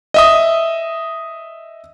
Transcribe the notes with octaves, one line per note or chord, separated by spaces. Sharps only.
D#5 E5 D#6